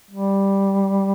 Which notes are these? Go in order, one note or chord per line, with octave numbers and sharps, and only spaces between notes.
G3